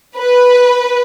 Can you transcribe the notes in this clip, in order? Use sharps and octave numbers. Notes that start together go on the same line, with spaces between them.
B4